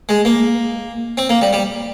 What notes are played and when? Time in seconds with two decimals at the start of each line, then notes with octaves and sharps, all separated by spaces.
0.09 G#3
0.25 A#3
1.17 C4
1.29 A#3
1.41 G3
1.53 G3